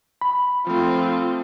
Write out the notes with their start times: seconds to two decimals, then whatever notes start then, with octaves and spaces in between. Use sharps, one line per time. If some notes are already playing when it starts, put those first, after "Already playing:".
0.21 B5
0.67 F3 A3 C4 F4